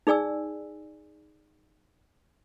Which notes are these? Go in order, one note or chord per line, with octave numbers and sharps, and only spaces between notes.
D#4 G#4 D5 G#5 E6